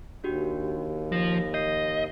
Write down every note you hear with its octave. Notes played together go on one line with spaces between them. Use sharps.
D#2 D4 F#4 G4
F3 A#6
D#5 G6 C7